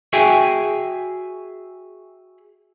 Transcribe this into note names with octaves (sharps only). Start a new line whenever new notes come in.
F#4 G#4 E5 G5 G#5